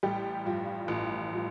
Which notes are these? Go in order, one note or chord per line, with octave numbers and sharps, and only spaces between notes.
A1 G3 G4
G2 F3
A1
F3